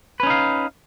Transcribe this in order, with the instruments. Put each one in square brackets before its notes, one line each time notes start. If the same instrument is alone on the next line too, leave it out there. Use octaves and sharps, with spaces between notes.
[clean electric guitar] B4
C#4
D#4
F5